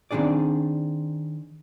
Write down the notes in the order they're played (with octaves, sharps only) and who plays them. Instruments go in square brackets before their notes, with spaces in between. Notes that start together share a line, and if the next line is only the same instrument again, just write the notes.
[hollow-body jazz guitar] D#3 C4 D4 G#4 D5